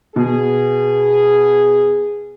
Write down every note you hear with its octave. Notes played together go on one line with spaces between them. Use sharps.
B2 B3 G#4